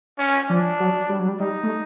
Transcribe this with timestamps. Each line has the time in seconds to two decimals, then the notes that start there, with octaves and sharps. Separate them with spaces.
0.19 C#4
0.49 F3 D4
0.80 F#3
1.09 G3
1.19 F#3
1.28 G3
1.40 G3 D#4
1.63 A3